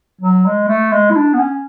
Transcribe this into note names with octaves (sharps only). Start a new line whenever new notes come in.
F#3
G#3
A3
G#3
E4
D4
B3
C#4